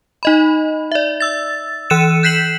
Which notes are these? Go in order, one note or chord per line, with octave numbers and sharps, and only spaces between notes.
D#4 D#5 B5
D5 E5
E6 A6
E3 E6 F#6 C#7 D#7 E7
F#6 G6 B6 C7 E7 F#7